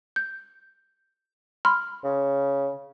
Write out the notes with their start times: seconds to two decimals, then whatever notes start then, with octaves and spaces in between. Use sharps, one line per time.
0.16 G6
1.65 B5 C6 F6
2.04 C#3